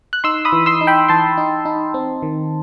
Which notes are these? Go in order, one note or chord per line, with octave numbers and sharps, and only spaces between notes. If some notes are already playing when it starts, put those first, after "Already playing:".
F#6
D#4 C6 E6
B5 D#6
E3
C6 E6
D#4
G5 B5
E3 A5 C6
D#4
D#4
C4
D#3